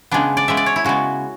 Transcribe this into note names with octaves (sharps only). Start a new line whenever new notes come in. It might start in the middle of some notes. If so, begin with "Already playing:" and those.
C#3 G#3 B3 D4
D5
C#3 G#3 B3 E5
D5
C#5
E4
C#3 G#3 B3 F#4